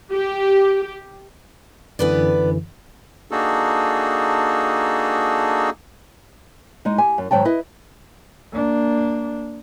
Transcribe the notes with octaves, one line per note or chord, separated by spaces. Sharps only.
G4
F#2 D3 E3 B3 B4 D5
A#3 D4 D#4 F#4 G#4 A4
G#3 D#4
G4 G#5
F#2
G#2 D#3 F#3 G5 A5
E4 B4 D#5
A#3 D4